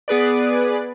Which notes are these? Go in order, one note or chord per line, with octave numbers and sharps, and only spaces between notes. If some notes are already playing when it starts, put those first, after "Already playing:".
B3 G#4 B4 D5